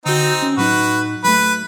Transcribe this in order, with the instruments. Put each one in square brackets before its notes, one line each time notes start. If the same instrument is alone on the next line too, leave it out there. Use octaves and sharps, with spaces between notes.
[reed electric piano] D3 F#4 [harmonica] C4 D#4
[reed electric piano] C#4
[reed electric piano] A2 F#3 D#4 [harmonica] F#4 B4
[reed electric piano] F#3 A3 [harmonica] B4